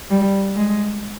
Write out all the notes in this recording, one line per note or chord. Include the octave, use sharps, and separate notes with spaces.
G3
G#3